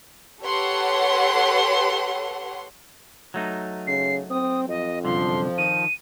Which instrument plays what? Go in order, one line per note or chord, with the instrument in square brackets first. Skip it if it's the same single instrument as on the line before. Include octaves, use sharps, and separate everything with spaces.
[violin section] G4 A4 B4 C#5 F#5 C6
[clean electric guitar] F#3 A3 D#4
[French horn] C#3 [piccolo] C7
[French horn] C4 [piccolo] D#6
[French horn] F2 [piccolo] D#5
[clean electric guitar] C2 F#2 D3 [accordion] F3 [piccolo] C6
[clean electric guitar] D#3 [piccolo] D#7